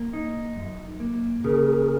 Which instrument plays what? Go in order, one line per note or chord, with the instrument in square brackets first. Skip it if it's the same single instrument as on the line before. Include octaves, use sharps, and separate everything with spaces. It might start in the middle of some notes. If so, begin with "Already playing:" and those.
Already playing: [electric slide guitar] A#3
D#4
F#2
A#3
[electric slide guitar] C#3 [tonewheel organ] G#4 A#4